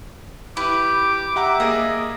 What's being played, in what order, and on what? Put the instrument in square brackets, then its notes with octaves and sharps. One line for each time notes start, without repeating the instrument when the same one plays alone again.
[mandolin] E4 B4 [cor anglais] G4 [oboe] D6
[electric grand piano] G4 F#5 A#5 [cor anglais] E5
[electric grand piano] A#3 G#4 [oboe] D#5 [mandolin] D#6